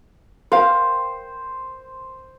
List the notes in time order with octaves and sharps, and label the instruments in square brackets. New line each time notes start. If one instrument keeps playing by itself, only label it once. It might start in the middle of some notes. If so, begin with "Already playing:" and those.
[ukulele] A#4 F5 G5 [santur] C5